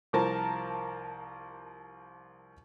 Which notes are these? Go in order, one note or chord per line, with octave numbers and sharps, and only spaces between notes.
C2 F3 A#4 A5